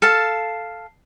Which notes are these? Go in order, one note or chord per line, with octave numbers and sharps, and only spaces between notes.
A4 F5 A5